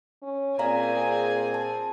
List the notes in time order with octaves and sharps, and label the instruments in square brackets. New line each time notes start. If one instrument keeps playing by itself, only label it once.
[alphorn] C#4
[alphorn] A#2 [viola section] C4 G#4 G#5 [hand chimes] D5 F5 A#5
[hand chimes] A5